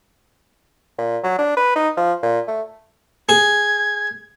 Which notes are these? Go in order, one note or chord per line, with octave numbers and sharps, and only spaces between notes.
A#2
F#3
D4
B4
D#4
F3
A#2
A3
G#4 G#6